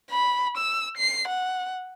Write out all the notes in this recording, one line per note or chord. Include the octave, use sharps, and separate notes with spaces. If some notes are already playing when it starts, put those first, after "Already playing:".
B5
E6
C7
F#5